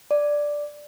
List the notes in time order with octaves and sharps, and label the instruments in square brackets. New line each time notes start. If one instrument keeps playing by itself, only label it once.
[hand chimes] D5